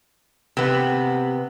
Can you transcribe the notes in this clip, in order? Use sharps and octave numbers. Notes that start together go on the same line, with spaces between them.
C3 B3